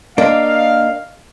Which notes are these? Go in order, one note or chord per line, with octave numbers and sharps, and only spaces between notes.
A#3 D4 D#5 F5